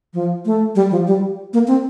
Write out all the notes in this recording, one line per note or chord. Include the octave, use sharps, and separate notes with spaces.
F3
A3
G3
F3
G3
A#3
C4